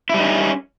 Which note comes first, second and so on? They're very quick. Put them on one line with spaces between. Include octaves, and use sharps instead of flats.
E4 G3 D#4 C#4